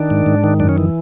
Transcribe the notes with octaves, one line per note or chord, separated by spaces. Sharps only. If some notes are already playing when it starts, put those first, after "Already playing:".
Already playing: D#3 D4
G#2
G#2
D#3
F#2 D4
C#4
E3